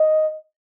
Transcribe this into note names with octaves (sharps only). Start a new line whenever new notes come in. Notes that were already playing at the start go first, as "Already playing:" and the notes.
Already playing: D#5